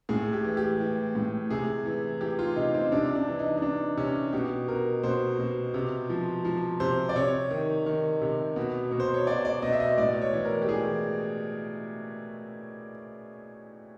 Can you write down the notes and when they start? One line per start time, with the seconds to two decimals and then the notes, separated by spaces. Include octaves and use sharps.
0.09 A2 G#4
0.33 G4
0.44 E3
0.57 G4
0.80 E3
1.15 A2
1.50 C3 G#4
1.86 E3
2.21 E3 G4
2.39 F4
2.56 C3 D#4
2.74 C4
2.92 C3 D4
3.15 D4
3.28 E3
3.39 D#4
3.57 D#4
3.62 E3 D4
3.97 C3 C#4
4.33 B2 G4
4.68 B2 A#4
5.03 B2 C5
5.39 B2
5.74 C3
6.10 F3
6.45 F3
6.80 C3 C5
7.09 D5
7.16 C3 C#5
7.51 D#3
7.86 D#3
8.21 C3
8.56 B2
8.91 B2
9.00 C5
9.14 C#5
9.27 B2 D5
9.45 D5
9.62 B2 D#5
9.73 E5
9.80 D#5
9.98 A2 D5
10.21 C#5
10.33 E3
10.45 A#4
10.62 G4
10.69 E3 G#4